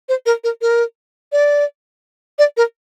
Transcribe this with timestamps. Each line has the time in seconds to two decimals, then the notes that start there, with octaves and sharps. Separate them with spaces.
0.09 C5
0.26 A#4
0.44 A#4
0.61 A#4
1.32 D5
2.39 D5
2.57 A#4